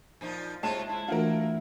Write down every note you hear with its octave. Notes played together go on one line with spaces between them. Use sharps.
A#2 F3 D#4
C3 G#3 F4 C#5 A5 E7
E4
E3 A3 D4 F4 F#4 A#4